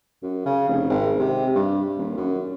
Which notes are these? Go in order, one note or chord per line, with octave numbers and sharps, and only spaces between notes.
F#2
C#3
F1
G#1
C3
G2
D#1
F#2